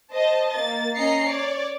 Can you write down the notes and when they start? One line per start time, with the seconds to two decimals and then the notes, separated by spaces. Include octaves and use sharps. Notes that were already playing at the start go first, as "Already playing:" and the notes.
0.13 C5 D#5 A5
0.53 A#3 A6
0.96 C#4 D#5 A#5 C7 C#7
1.28 C#5 D5